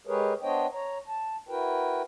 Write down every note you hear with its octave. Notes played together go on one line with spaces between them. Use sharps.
G#3 G4 G#4 A#4 B4 C#5
B3 D4 C5 C#5 D#5 G5
C#5 A#5
A5
E4 F#4 A#4 B4 G5